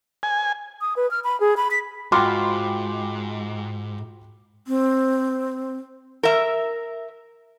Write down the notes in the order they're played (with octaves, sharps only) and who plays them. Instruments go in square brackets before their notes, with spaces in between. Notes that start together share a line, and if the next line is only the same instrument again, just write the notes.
[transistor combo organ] G#5
[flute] D#6
B4
F6
B5
G#4
B5
B6
[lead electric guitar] G#2 [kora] F4 F#4 [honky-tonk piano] G5 B5 C6 [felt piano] D6
[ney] C4
[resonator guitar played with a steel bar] A#4 E5